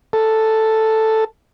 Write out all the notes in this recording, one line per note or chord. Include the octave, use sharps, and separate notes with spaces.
A4